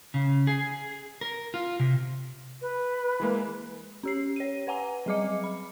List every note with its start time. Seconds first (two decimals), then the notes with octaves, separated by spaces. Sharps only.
0.14 C#3
0.47 G#4
1.21 A#4
1.54 F4
1.80 C3
2.61 B4
3.20 E3 G#3 A#3
4.03 C#4 G4 C7
4.36 C#5 D#7
4.67 B4 F#5 G#5 A#5
5.06 F#3 G3 G#4 D#5 D6 C#7
5.44 B5